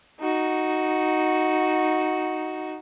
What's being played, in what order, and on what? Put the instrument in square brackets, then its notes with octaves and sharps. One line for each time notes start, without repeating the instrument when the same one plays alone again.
[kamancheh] D#4 F#4